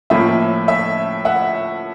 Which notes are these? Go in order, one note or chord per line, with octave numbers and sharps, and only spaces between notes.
A2 F3 A#3 C#4 E5
E5
E5 F#5